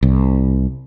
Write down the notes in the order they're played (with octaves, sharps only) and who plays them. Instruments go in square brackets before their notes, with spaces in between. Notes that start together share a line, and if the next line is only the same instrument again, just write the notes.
[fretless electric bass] C2